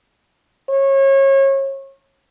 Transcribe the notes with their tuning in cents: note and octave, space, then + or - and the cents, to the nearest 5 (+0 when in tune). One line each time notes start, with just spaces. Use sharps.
C#5 -30